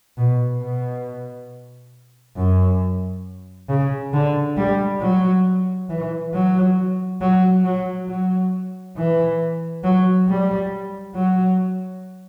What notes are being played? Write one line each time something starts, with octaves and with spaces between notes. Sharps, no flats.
B2
B2
F#2
C#3
D3
G3
F#3
E3
F#3
F#3
F#3
F#3
E3
F#3
G3
F#3